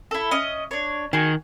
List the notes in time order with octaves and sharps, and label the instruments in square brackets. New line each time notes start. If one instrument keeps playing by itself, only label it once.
[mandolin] E4 A4
C#4 D#5
D4 C#5
[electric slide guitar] D#3 [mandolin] F#4 G#4